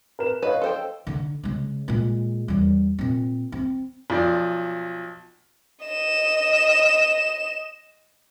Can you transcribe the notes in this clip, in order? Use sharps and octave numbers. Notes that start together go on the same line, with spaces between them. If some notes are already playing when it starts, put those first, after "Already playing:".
A#4 B4 E7
B4 C#5 D#5 F5
A4 C5 G5
D3 D#4
C#3 G#3
A#2 G#3
E2 G3
A#2 C4
C4
B1 F3 D5
D#5 E7